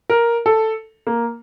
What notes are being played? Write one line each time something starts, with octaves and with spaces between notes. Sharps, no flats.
A#4
A4
A#3